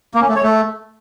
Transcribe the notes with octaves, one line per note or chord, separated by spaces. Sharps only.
A#3
C#4
A3
C#5
A3